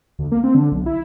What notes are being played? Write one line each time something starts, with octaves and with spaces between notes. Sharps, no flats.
D2
A#3
C4
D3
B1
E4